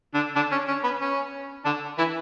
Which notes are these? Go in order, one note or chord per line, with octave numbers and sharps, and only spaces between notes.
D3 D4
D3 D4
C#4
C#4
B3
C#4
D3 D4
E3 E4